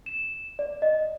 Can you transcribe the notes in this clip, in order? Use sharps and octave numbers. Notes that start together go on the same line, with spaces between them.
E7
D5
D#5